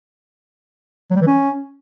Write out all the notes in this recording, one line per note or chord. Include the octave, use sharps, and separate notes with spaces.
F#3
G3
E3
C#4